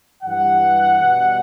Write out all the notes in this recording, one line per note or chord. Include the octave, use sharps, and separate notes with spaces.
G2 E3 G3 F#5
B2 G3